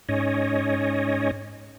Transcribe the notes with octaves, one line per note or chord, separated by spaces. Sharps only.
G#2 C#4 C#5 D#5